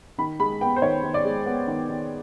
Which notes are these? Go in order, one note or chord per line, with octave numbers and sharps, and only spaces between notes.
D#3 B5
G#3 B5
B3 G5
C5
D#3 C#5
D#3
D5
G#3
B3
D#3
D#3